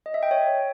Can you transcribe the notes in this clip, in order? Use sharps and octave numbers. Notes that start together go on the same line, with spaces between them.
D#5
E5
G5
C#5